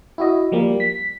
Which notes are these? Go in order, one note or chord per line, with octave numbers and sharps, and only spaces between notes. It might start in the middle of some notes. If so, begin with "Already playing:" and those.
E4 F#4 D#5
F3 G3 A#3
B6